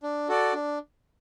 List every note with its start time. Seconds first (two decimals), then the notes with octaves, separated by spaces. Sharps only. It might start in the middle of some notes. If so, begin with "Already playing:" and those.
0.03 D4
0.28 F#4 A4 D5
0.53 D4